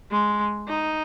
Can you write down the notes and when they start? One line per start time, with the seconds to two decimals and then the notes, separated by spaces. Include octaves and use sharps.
0.11 G#3
0.68 D#4